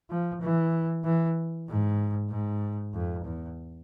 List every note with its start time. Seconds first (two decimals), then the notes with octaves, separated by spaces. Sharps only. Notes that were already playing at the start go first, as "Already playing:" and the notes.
0.10 F3
0.42 E3
1.05 E3
1.68 G#2
2.30 G#2
2.94 F2
3.24 E2